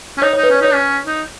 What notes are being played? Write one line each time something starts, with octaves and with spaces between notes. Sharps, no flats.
C#4
D#4 C#5
D#4 C#5
B4
C#4 C#5
D#4 C#5
C#4
D#4